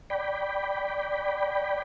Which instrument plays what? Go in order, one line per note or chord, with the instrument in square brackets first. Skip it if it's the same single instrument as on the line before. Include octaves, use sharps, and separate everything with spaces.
[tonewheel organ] D5 G5 B5